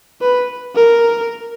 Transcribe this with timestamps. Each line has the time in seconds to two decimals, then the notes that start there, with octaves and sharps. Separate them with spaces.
0.22 B4
0.76 A#4